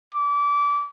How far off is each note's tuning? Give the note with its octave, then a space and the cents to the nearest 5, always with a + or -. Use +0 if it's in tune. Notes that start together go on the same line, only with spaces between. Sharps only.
D6 -25